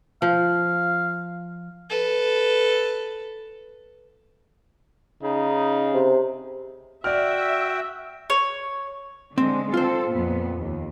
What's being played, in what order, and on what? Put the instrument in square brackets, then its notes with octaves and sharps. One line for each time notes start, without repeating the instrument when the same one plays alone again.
[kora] F3 [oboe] F5
[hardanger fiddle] A4 B4
[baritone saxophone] C#3 [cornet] D#4
[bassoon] C3
[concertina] F#4 G5 [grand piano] D5 F6 [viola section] E5
[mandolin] C#5
[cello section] D3 G#3 [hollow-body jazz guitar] C4
[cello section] C4 A4 [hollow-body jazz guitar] F4 C5
[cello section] F2 A#2 B3
D#2